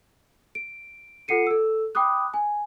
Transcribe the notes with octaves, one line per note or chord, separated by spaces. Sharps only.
D7
F4 A4 F#5 C7 C#7 D#7
A4 E6
G5 B5 D6 D#6 F#6
G#5